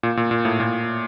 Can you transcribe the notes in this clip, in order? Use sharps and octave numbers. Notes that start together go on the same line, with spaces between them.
A#2
A#2
A#2
A2
A#2